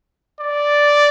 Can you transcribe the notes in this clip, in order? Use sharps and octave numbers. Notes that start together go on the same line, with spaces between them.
D5